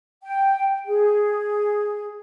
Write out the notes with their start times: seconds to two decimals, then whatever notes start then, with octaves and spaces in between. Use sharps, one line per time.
0.23 G5
0.87 G#4